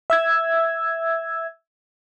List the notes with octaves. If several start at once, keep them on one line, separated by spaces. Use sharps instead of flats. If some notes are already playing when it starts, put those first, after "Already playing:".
E5 E6 G#6